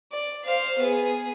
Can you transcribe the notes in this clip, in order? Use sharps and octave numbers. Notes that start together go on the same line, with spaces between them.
D5
C5 F5
B3 G#4